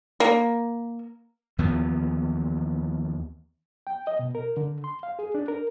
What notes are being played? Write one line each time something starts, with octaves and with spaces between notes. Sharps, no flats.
A#3
D#2 E3 F3 B3
G5
D#5
B2
A#4
D3
C6
F5
G#4
D4
A#4